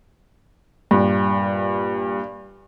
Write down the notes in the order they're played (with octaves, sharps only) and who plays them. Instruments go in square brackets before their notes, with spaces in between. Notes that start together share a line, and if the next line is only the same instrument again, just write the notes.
[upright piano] G2 A#2